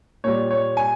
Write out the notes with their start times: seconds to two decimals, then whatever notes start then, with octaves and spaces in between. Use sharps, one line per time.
0.24 A#2 G3 C#5
0.51 C#5
0.77 G#5